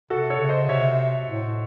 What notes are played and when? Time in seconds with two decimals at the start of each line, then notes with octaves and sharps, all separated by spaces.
0.10 C3 F#4 A4
0.30 A4 C#5
0.40 C#3
0.49 C5 D#5
0.69 C3 C#5 E5
1.27 A2